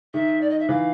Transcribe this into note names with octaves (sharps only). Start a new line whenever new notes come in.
D#3 E5
D5
D#5
E5
E3 F5